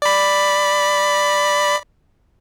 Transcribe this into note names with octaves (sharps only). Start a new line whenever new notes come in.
D5 B5